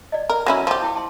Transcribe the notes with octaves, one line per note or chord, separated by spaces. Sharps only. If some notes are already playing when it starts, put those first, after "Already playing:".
D5 D#5
A#4
F#3 C#4 E4
F3 G4
E4 G5 D6
A5 C6